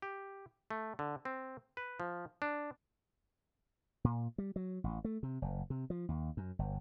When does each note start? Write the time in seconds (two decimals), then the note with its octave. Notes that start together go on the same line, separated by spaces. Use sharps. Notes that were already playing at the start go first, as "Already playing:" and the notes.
0.02 G4
0.71 A3
0.99 D3
1.25 C4
1.77 B4
2.00 F3
2.42 D4
4.04 A#2
4.38 G3
4.56 F#3
4.84 A1
5.05 A3
5.23 C3
5.42 F#1
5.70 C3
5.90 F3
6.09 D#2
6.37 F#2
6.59 G1